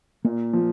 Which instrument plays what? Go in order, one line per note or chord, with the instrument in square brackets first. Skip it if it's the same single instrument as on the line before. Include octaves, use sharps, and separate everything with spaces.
[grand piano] A#2 [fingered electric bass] A#3
[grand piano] F3